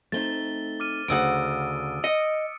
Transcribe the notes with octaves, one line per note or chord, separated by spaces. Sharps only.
A3 C4 D#4 A6 G7
D6 F6 D#7
D2 C#3 F#5 D#6 E6 D7
D#5 C#7